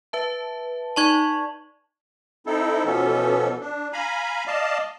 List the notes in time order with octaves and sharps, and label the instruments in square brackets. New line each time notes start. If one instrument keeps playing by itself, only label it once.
[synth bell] B4 E5 A5
[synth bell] D#4 D5 F#7 [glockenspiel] A5 C#6 G#6
[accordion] C4 D#4 E4 A4
B2 E3 F3 B3 C#4 A4
D4
F5 G#5 A#5 B5
D5 D#5 F5 A5